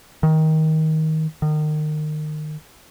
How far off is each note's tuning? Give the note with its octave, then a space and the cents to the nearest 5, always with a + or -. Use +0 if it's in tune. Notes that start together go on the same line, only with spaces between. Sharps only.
D#3 +20
D#3 -30